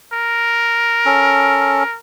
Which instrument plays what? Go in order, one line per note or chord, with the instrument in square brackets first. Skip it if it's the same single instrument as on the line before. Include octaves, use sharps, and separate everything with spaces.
[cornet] A#4
[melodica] C#4 A4